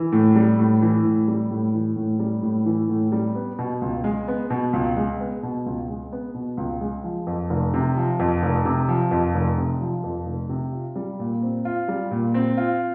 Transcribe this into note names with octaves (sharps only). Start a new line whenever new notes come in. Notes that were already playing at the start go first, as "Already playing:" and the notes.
Already playing: E3
A2
G3
A2
E3
A2
G3
A2
E3
A2
G3
A2
E3
A2
G3
B3
B2
C#2
G#3
B3
B2
C#2
G#3
B3
B2
C#2
G#3
B3
B2
C#2
G#3
F3
F2
F1
C3
F3
F2
F1
C3
F3
F2
F1
C3
F3
F2
F1
C3
F4
G3
A#2
C4
F4
G3
A#2
C4
F4